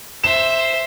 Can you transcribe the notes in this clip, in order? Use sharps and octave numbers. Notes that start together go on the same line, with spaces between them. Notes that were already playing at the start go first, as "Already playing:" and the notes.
C5 E5 E7